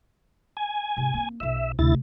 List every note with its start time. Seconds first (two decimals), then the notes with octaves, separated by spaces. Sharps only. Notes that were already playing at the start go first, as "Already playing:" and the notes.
0.57 G#5
0.97 G#2 C3
1.14 A#3 C4
1.40 B1 F4 E5
1.79 D2 C3 A3 E4 A6